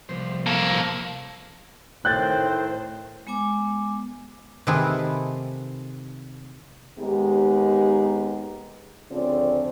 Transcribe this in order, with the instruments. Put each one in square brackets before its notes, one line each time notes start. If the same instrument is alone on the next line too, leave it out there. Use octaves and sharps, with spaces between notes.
[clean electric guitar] C2 F3 C5
[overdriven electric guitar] A#3 A4
[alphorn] A2 [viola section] D#3 C5 [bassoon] C4 [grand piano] F#6 G6 A6
[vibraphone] G#3 B3 G#5 D6
[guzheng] C3 D#3 A3 C4 G#4 B4
[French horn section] D#2 G#3 B3 D#4 G4
D2 C#3 F3 C4 D5